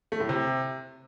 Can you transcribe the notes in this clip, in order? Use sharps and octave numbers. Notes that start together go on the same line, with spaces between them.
A3
A2
C3